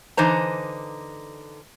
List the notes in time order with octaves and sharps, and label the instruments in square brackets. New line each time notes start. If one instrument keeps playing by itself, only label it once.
[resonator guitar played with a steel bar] D3 E3 D#4 C5 A#5